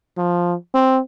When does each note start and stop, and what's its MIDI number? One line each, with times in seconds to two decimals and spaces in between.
0.18 0.54 53
0.74 1.00 60